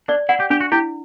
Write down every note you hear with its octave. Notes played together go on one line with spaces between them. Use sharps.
D4 D5
E4 F#5
G4
D4 G4
F#4
E4 G4